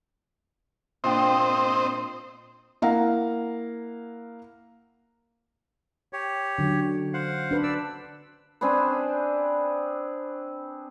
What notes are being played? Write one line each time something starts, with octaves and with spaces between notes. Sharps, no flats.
A#2 C4 D4 C5 D#5 G5
A#3 E4 F5 F#5 A#5
G4 C#5
D3 F#3
C5 F5 F#5
D4 B4
D5 E6
C4 D4 G#4 B4